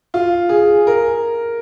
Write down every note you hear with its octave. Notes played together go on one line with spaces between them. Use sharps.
F4
G#4
A#4